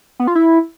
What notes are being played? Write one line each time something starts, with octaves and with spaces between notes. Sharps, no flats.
B3
F4
E4